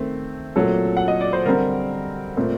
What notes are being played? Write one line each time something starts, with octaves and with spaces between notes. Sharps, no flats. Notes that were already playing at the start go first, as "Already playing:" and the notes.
Already playing: D#3 A3 C4
A#2 F#3 A3 C4 A4
F#5
D#5
D5
C5
D3 G3 C4 A#4
A#2 A3 C4